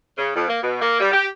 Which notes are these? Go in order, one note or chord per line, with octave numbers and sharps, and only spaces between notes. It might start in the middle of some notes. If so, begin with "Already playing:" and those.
C#3
F2
A#3
B2
A#3
G3
G4